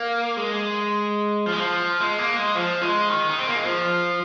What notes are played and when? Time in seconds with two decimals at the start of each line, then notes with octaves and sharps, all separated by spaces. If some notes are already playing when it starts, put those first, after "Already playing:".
Already playing: A#3
0.37 G#3
1.46 F3
1.52 G#3
1.59 F3
2.00 G#3
2.19 A#3
2.36 G#3
2.55 F3
2.82 G#3
3.09 D#3
3.30 D#4
3.38 C4
3.47 A#3
3.56 G#3
3.63 F3